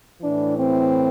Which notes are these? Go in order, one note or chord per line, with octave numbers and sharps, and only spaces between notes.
A2 E3 D4
C4